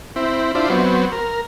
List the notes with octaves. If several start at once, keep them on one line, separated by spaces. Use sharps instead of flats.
C4 E4
D4 E4 F4 C5
F#3 B3 C4
A#4